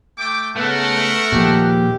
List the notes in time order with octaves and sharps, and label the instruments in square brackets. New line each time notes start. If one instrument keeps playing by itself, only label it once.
[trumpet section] A3 G5 D6
[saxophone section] C#3 B3 [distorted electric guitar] A3 [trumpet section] A#4 B4 F#5
[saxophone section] D#2 G#3 G4 [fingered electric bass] A#2 F3